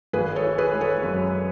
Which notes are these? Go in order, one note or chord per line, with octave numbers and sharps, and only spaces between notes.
G#1 G#4 B4
A4 C#5
E3
G#4 B4
G#3
A4 C#5
F#2